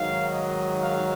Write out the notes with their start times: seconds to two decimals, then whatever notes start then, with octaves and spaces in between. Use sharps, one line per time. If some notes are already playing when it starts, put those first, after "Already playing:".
Already playing: G#2 D#3 F#3 F5
0.33 D#5
0.83 F5